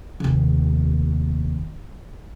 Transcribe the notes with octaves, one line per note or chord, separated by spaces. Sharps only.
F1 D#2